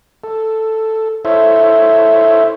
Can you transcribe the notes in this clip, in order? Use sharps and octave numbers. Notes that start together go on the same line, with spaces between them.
A4
E4 A4 C5 C#5 E5